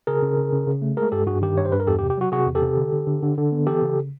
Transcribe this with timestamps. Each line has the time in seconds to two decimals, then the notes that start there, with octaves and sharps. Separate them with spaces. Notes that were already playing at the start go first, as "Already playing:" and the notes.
0.07 C#3 G#4 A#4
0.22 C#3
0.38 C#3
0.52 C#3
0.67 C#3
0.82 A3
0.97 G#3 G#4 A#4
1.12 G2 G4 A4
1.27 G2 F#4 G#4
1.42 D#3 G4
1.57 G2 C#5
1.65 C5
1.72 G2 B4
1.80 A#4
1.87 E2 G4 A4
1.99 G4
2.02 C3
2.10 G4
2.18 F#3 F#4
2.32 C3 F#4 G#4
2.47 E2
2.55 G4 A4
2.62 C3
2.77 D3
2.93 D3
3.07 D3
3.23 D3
3.38 D3
3.52 B3
3.67 E3 G4 A4
3.82 C#3